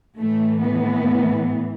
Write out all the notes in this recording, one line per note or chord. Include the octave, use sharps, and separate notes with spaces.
A2 E3 A3
B3